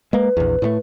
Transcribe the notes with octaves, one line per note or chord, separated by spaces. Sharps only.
G#3 A#3 B4
A#1 E2
A2 G#3 A3